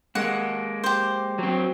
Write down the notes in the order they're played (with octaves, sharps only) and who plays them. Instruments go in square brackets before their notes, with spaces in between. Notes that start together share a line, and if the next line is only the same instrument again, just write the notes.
[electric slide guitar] G#3 A#3 [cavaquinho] F#5
[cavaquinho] G4 C5
[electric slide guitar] F#3 C4